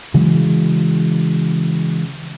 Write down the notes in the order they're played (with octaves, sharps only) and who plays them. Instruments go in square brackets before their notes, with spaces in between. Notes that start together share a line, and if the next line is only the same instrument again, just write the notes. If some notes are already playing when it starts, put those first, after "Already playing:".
[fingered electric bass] C#3 E3 F#3 G#3